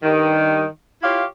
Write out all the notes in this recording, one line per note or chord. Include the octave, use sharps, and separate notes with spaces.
G2 D#3
E4 F4 G4 C#5 F5